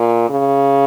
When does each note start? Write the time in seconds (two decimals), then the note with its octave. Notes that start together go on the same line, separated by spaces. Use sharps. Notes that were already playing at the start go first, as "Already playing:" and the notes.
Already playing: A#2
0.29 C#3